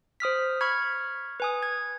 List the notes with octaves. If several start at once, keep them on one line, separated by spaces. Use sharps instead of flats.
C5 D#6 F6 B6
B5 C#6 F6 G#6
B4 G#5 D#6
G#6